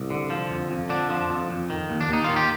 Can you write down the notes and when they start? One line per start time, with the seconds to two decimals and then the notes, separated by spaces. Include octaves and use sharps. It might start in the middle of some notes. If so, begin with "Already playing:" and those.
Already playing: C2
0.10 D3
0.30 F3
0.50 F2
0.71 F2
0.89 D3 D4
1.10 F3
1.30 F2
1.50 F2
1.70 D#3
1.90 D#2
2.01 D4
2.10 D#2 D#4
2.24 D#3 F4
2.36 G4